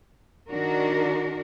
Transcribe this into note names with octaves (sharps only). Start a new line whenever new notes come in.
D#3 D4 F#4 A#4